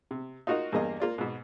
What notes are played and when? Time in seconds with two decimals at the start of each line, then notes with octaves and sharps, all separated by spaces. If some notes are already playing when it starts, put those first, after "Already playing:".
0.11 C3
0.47 D#4 F4 F#4 A#4 D#5
0.72 E2 G2 A#3 D#5
1.00 A#3 F4 D5
1.18 G#2 B2